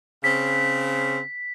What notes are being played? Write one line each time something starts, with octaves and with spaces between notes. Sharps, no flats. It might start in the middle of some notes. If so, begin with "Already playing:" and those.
C#3 C4 B6